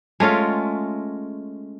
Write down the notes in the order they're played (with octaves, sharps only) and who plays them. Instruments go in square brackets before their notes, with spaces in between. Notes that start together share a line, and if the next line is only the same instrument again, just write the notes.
[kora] G#3 A3 C#4 F4